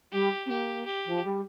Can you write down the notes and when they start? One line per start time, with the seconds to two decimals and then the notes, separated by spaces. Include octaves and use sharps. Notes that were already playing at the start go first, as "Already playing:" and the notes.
0.12 G3 G4
0.46 C4
0.50 A#3 G4
0.86 G4
1.05 F3
1.24 G3